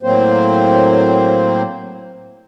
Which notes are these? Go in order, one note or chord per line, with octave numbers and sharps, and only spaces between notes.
A2 F#3 A#3 C4 C5